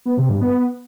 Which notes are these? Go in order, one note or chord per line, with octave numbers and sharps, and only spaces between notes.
B3
C3
G2
B3